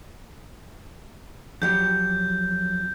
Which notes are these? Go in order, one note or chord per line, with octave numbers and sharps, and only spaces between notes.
F2 F#3 G4 G6